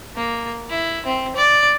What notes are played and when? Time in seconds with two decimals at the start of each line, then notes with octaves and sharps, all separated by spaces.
0.16 A#3
0.70 E4
1.06 C4
1.36 D5